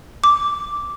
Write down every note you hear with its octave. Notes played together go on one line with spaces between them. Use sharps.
D6